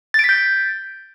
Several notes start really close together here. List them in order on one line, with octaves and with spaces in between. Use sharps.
A6 D7 B6 G6